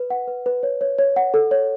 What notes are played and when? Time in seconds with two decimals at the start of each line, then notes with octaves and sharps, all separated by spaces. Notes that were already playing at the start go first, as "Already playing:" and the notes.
Already playing: B4
0.10 F#5
0.28 B4
0.46 B4
0.63 C#5
0.81 C#5
0.99 C#5
1.16 F#5
1.34 A4
1.51 C#5